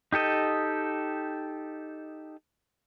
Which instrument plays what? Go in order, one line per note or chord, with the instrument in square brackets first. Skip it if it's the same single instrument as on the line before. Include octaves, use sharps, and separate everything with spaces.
[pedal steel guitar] D#4 G4 A4 D#5